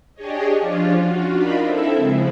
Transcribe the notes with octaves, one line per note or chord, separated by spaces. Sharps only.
D4 G4 G#4 C#5 D#5
F3 C#4 D4 F4
F4 F#4
D4 D#4 F4 A#4 B5
C4 E4 A4 E5
C#3 F3 G#3